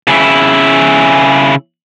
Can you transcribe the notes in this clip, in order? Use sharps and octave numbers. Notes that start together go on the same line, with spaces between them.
C#3 E4